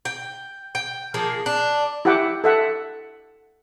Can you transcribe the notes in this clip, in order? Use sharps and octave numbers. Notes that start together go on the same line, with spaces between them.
G5
G5
F3 A#3 G#4
D4
E4 G4 E5 F#5 G5 D6
A4 E5 F#5